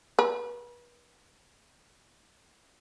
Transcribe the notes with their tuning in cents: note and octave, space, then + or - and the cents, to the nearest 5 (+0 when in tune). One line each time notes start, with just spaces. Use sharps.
B4 -35